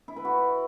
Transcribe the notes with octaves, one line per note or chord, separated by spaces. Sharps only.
E4
B4
F#4